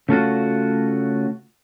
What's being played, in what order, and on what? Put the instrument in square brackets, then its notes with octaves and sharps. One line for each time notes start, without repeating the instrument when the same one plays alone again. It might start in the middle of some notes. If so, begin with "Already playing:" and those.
[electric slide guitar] C#3 A3 F4 F#4